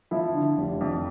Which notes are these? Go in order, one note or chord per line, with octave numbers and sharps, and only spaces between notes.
F3 E4
D3
F1
F2